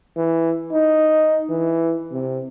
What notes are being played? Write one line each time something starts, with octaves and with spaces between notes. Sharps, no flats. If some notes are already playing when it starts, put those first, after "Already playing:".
E3
D#4
E3
C3